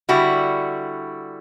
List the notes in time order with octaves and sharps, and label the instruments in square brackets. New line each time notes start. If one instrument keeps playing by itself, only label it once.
[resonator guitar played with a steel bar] D3 G3 E4 F#4